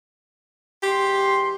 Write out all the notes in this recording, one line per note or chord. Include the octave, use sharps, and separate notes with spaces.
E3 G#3 G4 C6